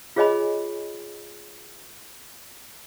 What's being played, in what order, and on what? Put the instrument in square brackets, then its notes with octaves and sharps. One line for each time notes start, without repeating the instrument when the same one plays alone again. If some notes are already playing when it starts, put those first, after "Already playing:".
[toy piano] F4 G#4 C#5 D#5 G#5 B5